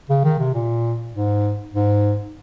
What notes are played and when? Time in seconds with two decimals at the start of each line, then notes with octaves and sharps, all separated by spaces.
0.09 C#3
0.24 D#3
0.39 C3
0.53 A#2
1.13 G#2
1.73 G#2